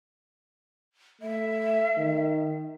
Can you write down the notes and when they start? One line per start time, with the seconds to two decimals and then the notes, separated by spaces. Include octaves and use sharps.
1.21 A3 E5
1.98 D#3